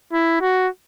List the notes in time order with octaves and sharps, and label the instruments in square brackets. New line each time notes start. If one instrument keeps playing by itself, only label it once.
[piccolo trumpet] E4
F#4